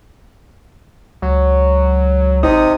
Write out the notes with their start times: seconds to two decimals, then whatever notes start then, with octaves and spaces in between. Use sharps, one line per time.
1.22 C#2 F#3
2.43 G#1 C3 D#4 D#6